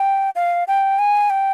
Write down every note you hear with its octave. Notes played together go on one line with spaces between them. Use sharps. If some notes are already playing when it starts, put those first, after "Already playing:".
Already playing: G5
F5
G5
G#5
G5